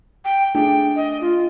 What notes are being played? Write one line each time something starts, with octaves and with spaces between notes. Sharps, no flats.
G5
A3 D4 G#4 G5
D#5
F4